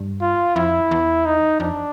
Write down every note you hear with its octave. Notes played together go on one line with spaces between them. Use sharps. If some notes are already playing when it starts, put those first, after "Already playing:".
Already playing: G2
F4
F2 E4
E2
D#4
F2 D4